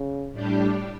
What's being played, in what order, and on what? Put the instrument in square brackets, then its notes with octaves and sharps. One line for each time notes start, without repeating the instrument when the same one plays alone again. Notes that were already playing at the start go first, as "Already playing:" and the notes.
Already playing: [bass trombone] C#3
[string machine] A2 G3 D4 G4